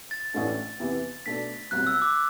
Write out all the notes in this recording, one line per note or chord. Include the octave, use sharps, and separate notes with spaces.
A6
A1 A2 E3 A3 D4
E2 C3 E3 B3 E4
B2 A3 D4 B6
C2 B2 F#3 F#6
E6
D6